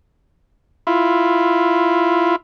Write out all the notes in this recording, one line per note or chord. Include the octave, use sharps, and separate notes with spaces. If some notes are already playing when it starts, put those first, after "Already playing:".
E4 F4